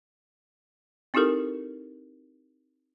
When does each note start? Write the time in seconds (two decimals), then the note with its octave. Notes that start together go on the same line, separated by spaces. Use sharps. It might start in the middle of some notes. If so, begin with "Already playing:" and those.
1.14 C4 D#4 E4 G4 A4 A#4